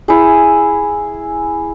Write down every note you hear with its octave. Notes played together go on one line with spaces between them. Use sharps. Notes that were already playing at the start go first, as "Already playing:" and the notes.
E4 G#4